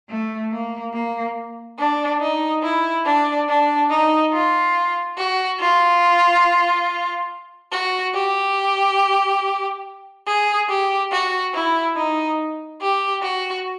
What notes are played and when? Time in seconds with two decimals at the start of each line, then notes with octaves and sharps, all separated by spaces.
0.09 A3
0.51 A#3
0.93 A#3
1.79 D4
2.21 D#4
2.63 E4
3.05 D4
3.48 D4
3.91 D#4
4.33 F4
5.18 F#4
5.60 F4
7.72 F#4
8.14 G4
10.27 G#4
10.69 G4
11.12 F#4
11.54 E4
11.96 D#4
12.81 G4
13.23 F#4